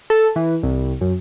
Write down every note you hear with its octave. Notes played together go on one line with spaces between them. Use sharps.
A4
E3
C2
F#2